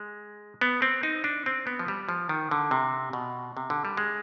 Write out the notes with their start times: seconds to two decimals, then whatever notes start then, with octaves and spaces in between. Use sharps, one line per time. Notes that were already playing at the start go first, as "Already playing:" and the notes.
Already playing: G#3
0.61 B3
0.82 C4
1.03 D#4
1.24 D4
1.46 C4
1.67 B3
1.79 F3
1.88 G3
2.09 F3
2.29 D#3
2.51 D3
2.71 C3
3.13 B2
3.57 C3
3.70 D3
3.85 G3
3.97 G#3